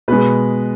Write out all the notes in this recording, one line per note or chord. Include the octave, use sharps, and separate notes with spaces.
B2 G#3 B4